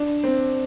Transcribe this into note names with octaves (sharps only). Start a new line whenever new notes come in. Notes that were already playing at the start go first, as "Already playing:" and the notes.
Already playing: D4
C4